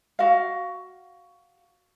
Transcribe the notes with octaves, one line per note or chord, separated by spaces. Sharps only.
F#4 F5